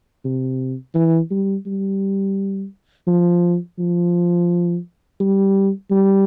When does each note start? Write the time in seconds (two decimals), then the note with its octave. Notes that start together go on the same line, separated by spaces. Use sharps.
0.25 C3
0.95 E3
1.31 G3
1.66 G3
3.07 F3
3.79 F3
5.20 G3
5.91 G3